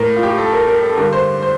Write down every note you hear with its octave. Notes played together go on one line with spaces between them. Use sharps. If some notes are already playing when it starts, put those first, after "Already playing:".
Already playing: A2 A#4
F4
G4
A4
A#4
A#4
A4
G2 D3 A#4
C5
C5